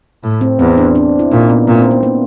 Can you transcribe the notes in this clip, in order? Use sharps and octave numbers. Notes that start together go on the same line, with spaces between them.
A2
C4
E2 C4
D4
D4
E4
A#2 D#4
B3
A#2 C4
C4
B3
A#3